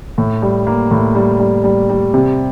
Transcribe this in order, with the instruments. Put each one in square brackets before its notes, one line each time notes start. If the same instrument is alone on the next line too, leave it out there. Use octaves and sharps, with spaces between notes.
[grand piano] A2
G3
A#3
A2
G3
G3
G3
G3
C3